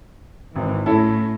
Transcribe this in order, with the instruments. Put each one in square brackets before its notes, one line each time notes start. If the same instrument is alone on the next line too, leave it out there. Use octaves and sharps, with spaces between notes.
[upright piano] G#1 [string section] E3
[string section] A2 [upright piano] C#4 E4 A4